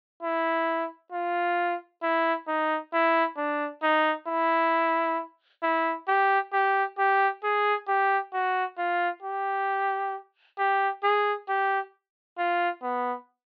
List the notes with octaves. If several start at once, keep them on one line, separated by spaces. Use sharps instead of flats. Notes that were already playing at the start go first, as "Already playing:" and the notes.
E4
F4
E4
D#4
E4
D4
D#4
E4
E4
G4
G4
G4
G#4
G4
F#4
F4
G4
G4
G#4
G4
F4
B3